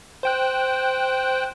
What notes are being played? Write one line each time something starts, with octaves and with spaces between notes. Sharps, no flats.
C5 G5 F#6